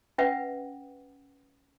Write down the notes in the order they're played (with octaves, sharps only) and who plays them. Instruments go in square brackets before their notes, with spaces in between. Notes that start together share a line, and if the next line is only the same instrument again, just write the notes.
[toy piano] C#4 B4 E5 F#5 G5